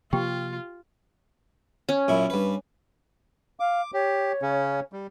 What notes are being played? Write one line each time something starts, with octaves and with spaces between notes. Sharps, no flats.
C3 F3 A#3 F4 G4 G5
C#4
F#2 A#2 E4
G2 B4
F5 D6
G4 C#5
C#3 C#4
G3